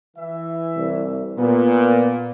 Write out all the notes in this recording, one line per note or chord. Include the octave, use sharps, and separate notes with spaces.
E3 E5
C2
A#2 B3